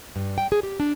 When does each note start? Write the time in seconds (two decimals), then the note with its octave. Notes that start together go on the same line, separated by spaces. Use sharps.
0.16 G2
0.38 G5
0.52 G#4
0.63 G4
0.80 D4